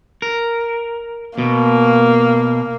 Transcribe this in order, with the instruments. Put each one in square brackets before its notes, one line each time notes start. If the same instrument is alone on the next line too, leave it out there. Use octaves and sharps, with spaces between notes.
[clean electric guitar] A#4
[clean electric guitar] B2 [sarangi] A#3